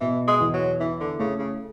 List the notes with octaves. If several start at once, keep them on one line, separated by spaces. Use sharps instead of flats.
B2 E3
G#3
E2
F#3
E3 E4
D3
C#3 A3
C#3